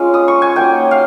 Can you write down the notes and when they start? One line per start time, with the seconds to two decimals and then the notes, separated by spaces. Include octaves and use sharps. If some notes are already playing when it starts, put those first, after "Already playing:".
Already playing: G#3 C#4 F4
0.14 D#6
0.28 C#6
0.42 G#5
0.56 F#3 A#3 D#4 G5
0.91 F5